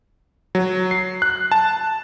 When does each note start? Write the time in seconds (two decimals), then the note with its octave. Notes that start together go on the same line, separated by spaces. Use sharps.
0.55 F#3
0.91 C7
1.22 F#6
1.52 A5